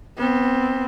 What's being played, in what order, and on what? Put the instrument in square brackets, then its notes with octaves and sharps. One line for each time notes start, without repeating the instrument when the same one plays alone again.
[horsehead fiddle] B3 C4